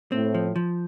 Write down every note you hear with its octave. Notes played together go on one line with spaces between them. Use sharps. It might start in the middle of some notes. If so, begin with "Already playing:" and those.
A2 A3 C4
F3
F3